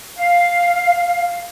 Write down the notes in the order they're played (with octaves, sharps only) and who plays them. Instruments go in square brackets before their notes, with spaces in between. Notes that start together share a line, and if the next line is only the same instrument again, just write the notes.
[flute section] F5